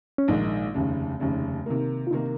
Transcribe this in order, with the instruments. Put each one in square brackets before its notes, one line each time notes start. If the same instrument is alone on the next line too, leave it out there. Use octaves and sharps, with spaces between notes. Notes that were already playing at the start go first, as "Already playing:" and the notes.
[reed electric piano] C#4
[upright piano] A#1 G#2 D#3 G#3 [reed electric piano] D#4
[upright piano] F1 D#2 C#3
F1 D#2 C#3
C3 D#3 A#3
[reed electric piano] F4
[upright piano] C3 D#3 A#3 [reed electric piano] D#4